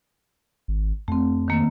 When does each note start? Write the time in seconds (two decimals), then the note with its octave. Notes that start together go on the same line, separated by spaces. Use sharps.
0.68 G#1
1.08 F2 A3 C4
1.48 D#3 A#3